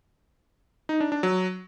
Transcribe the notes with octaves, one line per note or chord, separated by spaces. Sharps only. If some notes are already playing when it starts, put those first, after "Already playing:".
D#4
D4
D4
F#3